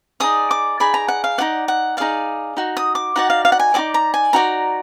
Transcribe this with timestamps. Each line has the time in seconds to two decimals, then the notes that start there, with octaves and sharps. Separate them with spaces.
0.20 D#4 G#4 D5 D#6
0.51 D6
0.80 D#4 G#4 D5 B5
0.94 A#5
1.08 F#5
1.24 F5
1.38 D#4 G#4 D5 F#5
1.68 F#5
1.97 D#4 G#4 D5 F5
2.57 D#4 F#4
2.77 D#6
2.95 D6
3.16 D#4 F#4 D5 F#5
3.30 F5
3.45 F5
3.52 F#5
3.60 G#5
3.74 D#4 F#4 D5 D6
3.94 A#5
4.14 G#5
4.33 D#4 F#4 D5 A#5